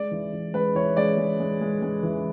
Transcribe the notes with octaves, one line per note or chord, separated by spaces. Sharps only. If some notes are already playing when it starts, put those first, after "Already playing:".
Already playing: G#3 D5
E3
E3
G#3 B4
E3 C#5
G#3 D5
G#3
G#3
G#3
G#3
E3